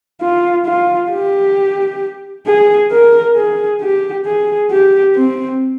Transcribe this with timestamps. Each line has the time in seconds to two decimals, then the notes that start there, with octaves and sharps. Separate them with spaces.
0.21 F4
0.66 F4
1.11 G4
2.47 G#4
2.91 A#4
3.36 G#4
3.82 G4
4.25 G#4
4.71 G4
5.16 C4